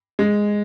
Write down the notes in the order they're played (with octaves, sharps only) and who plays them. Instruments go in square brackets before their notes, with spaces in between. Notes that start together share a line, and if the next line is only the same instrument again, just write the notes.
[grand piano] G#3